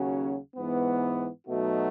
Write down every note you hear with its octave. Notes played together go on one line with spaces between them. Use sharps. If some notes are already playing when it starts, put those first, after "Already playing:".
Already playing: D#2 C#3 F#3 C#4 F#4
G#2 E3 B3
B2 F#3 A3 D#4 F#4